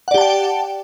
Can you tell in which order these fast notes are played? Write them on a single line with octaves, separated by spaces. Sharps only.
F#5 D5 G4 A5 G5